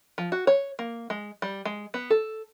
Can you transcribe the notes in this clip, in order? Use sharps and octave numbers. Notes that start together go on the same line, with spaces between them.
F3
F#4
C#5
A#3
G#3
G3
G#3
B3
A4